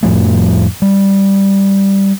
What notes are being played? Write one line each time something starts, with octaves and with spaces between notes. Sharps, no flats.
F2 A2 F3 A3
G3